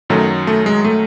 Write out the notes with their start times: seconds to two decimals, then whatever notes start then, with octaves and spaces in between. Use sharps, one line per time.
0.10 F#2 D#3 F#3 A3
0.47 A3
0.66 G#3
0.84 A3